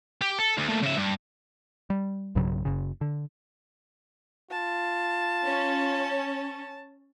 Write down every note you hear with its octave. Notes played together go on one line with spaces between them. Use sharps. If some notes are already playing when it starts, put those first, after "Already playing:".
G4
A4
D2
A#2 A3
C#3 E5
G2
G3
B1 G2 C#3 F#3
F#1 C#3
D3
F4 A5
C#4